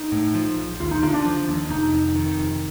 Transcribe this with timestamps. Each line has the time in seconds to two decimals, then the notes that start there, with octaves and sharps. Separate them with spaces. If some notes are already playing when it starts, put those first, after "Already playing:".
Already playing: D#4
0.12 A2
0.35 F3
0.57 A#1
0.80 D#2 F4
0.91 D#4
1.02 D3 F4
1.14 D4
1.25 F3
1.48 D#2
1.70 F1 D#4
1.93 F2
2.15 D#3
2.38 F1